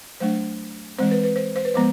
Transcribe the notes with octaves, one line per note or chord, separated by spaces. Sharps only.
F#3 A3 D4 C5
E3 G#3 C4 C5
B4
B4
C5
C5
B4
F3 G#3 B3 C5